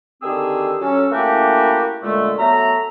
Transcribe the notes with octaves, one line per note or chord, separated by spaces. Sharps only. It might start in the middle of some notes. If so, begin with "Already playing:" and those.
D3 D#3 C4 G4 G#4 E6
F#3 C#4 A4
A3 A#3 C#4 E4 F#4 G4
A#2 D3 G#3 A3
F#3 A3 B3 E5 A#5